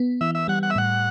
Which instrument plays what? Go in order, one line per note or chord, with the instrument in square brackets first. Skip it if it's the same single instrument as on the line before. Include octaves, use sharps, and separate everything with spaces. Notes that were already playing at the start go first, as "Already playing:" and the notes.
Already playing: [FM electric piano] B3
[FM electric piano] E3 [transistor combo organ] E5
[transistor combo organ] E5
[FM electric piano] G3 [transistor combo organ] F#5
[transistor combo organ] F#5
E5
[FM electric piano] A2 [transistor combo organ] F#5